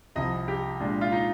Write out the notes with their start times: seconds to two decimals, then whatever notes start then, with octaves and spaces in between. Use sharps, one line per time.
0.16 C2 C3 F3 D#5
0.48 G4
0.80 A#2 G#3 D4
1.01 F4
1.12 D#4